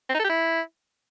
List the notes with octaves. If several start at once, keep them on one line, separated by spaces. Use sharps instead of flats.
C4
D#4
A4
G4
E4